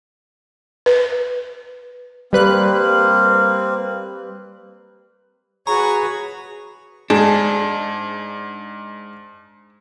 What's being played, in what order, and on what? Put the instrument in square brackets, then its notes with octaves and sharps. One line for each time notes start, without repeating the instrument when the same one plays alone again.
[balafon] B4
[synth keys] G3 B4 F#6 [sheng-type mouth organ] A#3 C4
[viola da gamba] F#4 B4 [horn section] G#4 [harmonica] C#5 [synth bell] A#5
[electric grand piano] G#2 [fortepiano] G#3 [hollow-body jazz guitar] D4